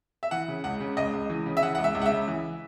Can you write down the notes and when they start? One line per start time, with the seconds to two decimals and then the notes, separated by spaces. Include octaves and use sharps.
0.23 E5
0.31 E3 F#5
0.48 C#3
0.64 C#2 F#5
0.80 C#3
0.97 C#2 D#5
1.13 C#2
1.29 E3
1.46 C#3
1.57 E5
1.62 E3 F#5
1.75 C#2 F#5
1.84 E5
1.95 C#2
2.02 F#5
2.06 E5
2.11 C#3
2.28 E3